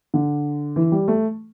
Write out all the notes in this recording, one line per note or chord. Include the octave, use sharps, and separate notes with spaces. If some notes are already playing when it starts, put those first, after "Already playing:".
D3
E3
G3
A3